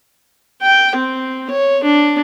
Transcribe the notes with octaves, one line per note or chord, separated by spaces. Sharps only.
G5
C4
C#5
D4